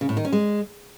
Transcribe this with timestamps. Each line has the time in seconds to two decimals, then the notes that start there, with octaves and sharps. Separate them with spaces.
0.01 C#3
0.09 A2
0.17 D#3
0.25 C#4
0.32 G#3